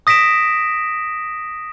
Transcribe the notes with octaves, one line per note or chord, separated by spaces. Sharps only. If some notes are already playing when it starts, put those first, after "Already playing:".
D#6 A#6 B6 D7 E7